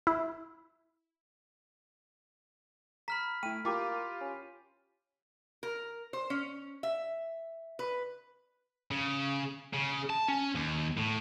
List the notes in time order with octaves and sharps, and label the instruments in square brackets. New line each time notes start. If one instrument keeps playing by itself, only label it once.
[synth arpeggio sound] E4
[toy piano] A#5 [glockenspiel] B5 F6 B6
[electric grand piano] A3 E4 [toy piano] G5 [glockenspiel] D#7
[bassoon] A#3 [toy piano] E4 G5 D6 [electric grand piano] F4 G4
[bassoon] C#4
[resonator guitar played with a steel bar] A#4
C5
C#4
E5
B4
[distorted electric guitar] C#3
C#3
A5
C#4
D#2
A2